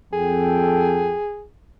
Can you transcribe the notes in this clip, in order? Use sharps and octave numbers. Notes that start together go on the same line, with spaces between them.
F2 G#4 A4 G5